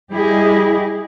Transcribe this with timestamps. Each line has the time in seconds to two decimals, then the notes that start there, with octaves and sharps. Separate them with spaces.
0.12 G3 E4 G4 G#4 D#5